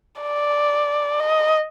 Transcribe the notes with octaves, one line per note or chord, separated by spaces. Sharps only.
D5
D#5